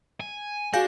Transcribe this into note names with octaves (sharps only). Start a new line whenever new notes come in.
G#5
D4 F#4 G#4 F5 G#5 G6 A#6